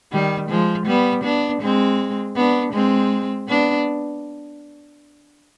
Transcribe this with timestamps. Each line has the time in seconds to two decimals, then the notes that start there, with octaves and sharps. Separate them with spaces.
0.12 D#3 G3
0.49 F3 G#3
0.86 G3 B3
1.24 B3 D4
1.61 G#3 C4
2.36 B3 D4
2.73 G#3 C4
3.48 B3 D4